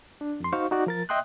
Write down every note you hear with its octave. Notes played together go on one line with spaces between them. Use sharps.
D4
F2 C6
D#4 F#4 C5 F5 C#6
D#4 F#4 D5
F3 A#4 A6
D#5 E5 G5 C6 D#6 F#6